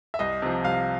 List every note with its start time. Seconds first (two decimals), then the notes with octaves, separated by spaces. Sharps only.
0.14 E5
0.19 C2 D#5
0.42 C3 F3
0.64 C2 F5